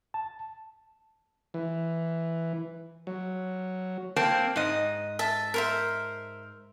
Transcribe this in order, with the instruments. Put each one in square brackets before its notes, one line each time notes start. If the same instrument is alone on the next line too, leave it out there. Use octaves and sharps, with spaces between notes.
[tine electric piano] A5
[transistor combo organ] E3
F#3
[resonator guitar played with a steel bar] A#3 C4 A5
G#2 D#5
[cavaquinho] E5 A5
A#4 C5 E5